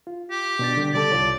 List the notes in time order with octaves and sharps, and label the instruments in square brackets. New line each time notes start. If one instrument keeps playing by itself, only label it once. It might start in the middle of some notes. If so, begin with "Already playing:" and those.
[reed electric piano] F4
[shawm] G4
[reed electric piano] B2 D4 A6
D3 G3 D4
[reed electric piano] C#3 G3 A4 [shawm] D5
[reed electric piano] C2 F4 C#5